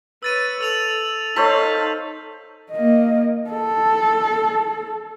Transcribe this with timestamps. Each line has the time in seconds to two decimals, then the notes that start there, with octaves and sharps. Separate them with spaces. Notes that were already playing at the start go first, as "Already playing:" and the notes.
0.23 B4 C#5 E6 A6 D#7
0.61 A4 E6 F7 F#7
1.36 D#4 A4 C5 C#5 F5 B6
2.72 A#3 D#5
3.50 A4